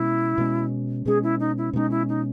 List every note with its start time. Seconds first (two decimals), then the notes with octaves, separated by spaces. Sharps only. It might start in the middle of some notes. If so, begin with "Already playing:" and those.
Already playing: B2 G#3 C#4 E4
0.38 B2 G#3 C#4
1.06 B2 G#3 C#4 G#4
1.23 E4
1.40 D#4
1.57 E4
1.73 B2 G#3 C#4 D#4
1.90 E4
2.08 D#4